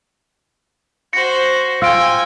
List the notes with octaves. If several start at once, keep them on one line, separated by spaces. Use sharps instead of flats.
F#4 C5 A#6 C#7
F4 G5 G#5 E6 D7